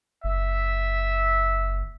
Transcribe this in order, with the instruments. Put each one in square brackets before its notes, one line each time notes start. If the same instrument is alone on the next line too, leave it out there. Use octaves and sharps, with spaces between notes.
[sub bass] F#1 [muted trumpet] E5